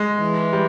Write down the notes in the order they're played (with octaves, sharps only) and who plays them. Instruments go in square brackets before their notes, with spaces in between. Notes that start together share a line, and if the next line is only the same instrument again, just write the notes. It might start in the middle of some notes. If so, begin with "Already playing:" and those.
Already playing: [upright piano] G#3
[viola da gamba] E3
[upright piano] G3